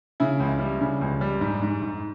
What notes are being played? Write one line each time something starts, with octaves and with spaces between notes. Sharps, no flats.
C#3 E4
C#2
G3
C#3
C#2
G3
G#2
G#2
G#2